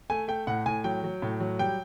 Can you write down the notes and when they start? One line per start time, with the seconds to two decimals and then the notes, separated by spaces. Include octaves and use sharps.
0.10 A3 G#5
0.28 A3 G5
0.47 A2 F#5
0.66 A2 G#5
0.84 F#3 G5
1.04 F#3
1.22 A2
1.40 F#3
1.59 G3 G5